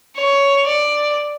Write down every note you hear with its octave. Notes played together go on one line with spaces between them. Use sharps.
C#5
D5